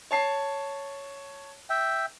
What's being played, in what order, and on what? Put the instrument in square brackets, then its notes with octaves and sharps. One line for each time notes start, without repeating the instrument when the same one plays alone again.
[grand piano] C#5 A5 C7
[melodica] E5 G5